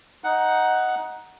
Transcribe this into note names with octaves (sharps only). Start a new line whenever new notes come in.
D#4 F#5